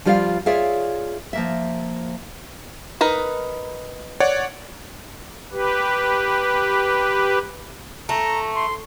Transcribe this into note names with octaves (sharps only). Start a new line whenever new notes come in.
F3 G3 F4 D5 D#5 F5
F4 G#4 C#5 D5 E5 F5
F3 A#3 E5
D#4 A#4 B4
C#5 D5 F#5
G4 B4
A3 A#5
C6